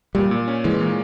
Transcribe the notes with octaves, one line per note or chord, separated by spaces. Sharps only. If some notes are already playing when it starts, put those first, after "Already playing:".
A#2 G3
A#2
C#4
E3 G#3
A#2